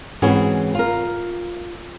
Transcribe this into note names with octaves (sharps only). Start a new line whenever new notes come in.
G#2 E3 C4 C#4 F#4 G#4
F4 A#4